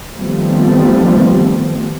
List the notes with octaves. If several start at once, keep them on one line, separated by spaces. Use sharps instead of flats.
D#3 F3 G3 A3 B3 C4